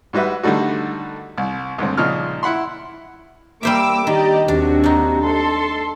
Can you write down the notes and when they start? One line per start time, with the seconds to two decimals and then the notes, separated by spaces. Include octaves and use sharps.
0.13 G#2 G3 F#4 B4 E5
0.43 D3 D#3 G3 A3 F#4
1.38 C2
1.78 C#2 G2 D3 C4
1.98 A#2 C#3 F3 D#4 F6
2.43 E4 F#5 B5 C6
3.63 G3 A#3 C5 E5 D6 E6
4.07 D#3 G4 D5 D#5
4.48 D#2 C3 D4 F#4
4.84 D4 D#4
5.24 A4 C6